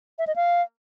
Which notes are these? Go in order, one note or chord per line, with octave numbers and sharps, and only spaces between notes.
E5
D#5
F5